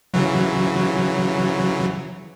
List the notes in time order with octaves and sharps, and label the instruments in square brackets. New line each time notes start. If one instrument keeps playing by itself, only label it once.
[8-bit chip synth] C#3 E3 F#3